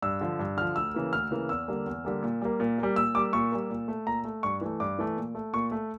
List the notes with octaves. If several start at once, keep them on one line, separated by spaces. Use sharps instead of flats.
G2 E6
D3 F3
G2
D3 F3 F6
D2 E6
C#3 E3 A#3
D2 F6
C#3 E3 A#3
E2 E6
D3 G3 A#3
E2
D3 G3 A#3
A#2
G3 A#3
A#2
G3 A#3
A#2 E6
G3 A#3 D6
A#2 C#6
G3 A#3
A#2
A3
A#2 A#5
A3
G2 C#6
E3 A3
G2 D6
E3 A3
A#2
A3
A#2 C#6
A3